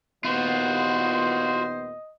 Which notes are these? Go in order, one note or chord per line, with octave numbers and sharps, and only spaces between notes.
D#2 A#2 B3 F4 F#4 C5 D#5